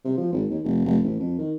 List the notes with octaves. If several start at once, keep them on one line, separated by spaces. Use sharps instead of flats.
C3
F3
G#1
D#2
F1
F1
A1
F2
D#3